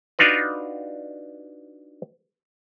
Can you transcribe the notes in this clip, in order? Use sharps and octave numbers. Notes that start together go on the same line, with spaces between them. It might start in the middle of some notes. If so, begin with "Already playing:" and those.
D4 D#4 F4 F#4 B4